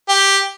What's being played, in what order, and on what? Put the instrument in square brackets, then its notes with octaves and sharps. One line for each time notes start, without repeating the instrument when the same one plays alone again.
[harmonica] G4